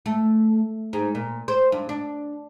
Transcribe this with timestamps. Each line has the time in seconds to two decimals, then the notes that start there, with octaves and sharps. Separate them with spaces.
0.06 A3
0.93 G#2
1.15 A#2
1.48 C5
1.72 G2
1.89 D4